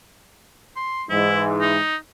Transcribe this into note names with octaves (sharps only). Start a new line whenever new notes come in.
C6
G#2 E3 E4
D#4